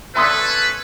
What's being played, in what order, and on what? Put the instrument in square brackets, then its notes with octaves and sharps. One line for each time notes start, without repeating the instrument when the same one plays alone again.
[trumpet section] C#4 A4 B4 [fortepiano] E5 C6 D#6